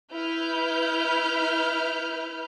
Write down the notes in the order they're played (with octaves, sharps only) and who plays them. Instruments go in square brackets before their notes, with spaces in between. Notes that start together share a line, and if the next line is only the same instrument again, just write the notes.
[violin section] E4 B4 F6 G6